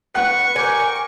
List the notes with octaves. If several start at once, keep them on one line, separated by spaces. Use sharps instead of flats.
B4 F#5 C#6
G4 A#4 G#5